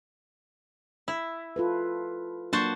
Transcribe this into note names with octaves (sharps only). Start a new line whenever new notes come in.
E4
F4 A4 B4
F#3 A#3 D4 F#4 C5 A5